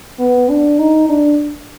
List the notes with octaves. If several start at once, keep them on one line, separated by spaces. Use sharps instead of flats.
B3
D4
D#4
D4